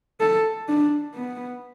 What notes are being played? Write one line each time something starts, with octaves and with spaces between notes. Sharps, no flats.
A4
D4
B3